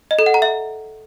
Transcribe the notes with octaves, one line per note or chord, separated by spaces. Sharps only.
D#5
A4
F#5
A#5
E5